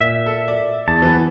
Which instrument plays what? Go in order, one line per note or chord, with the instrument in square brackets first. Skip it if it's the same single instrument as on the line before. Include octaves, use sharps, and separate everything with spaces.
[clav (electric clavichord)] A#2 [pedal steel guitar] E5
[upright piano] A4
D5
[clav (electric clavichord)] E2 [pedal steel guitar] A5
[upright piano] E3 B3